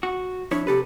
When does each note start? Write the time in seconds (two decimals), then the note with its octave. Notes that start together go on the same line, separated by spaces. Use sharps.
0.03 F#4
0.51 F2 D4 E4 C#5
0.67 C3 G4 A4 B4